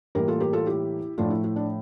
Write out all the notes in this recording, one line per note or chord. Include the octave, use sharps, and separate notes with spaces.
A2 E3 G3 A#3 G4 A#4
F4 A4
G4 A#4
F4 A4
E4 G4
A2 F3 A3 D4 F4
E4
E4
D4